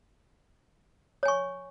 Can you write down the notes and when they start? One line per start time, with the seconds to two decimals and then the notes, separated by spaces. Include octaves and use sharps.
1.23 C#5
1.26 G#5
1.28 C#6